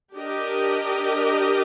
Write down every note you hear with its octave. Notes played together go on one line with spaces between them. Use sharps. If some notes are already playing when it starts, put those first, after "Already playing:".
D4 G4 A#4 D#5